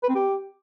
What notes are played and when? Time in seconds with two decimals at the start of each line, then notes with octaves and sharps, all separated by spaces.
0.03 B4
0.09 C4
0.15 G4